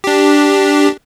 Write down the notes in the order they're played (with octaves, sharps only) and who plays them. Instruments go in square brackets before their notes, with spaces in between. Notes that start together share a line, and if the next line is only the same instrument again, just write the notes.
[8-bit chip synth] D4 G4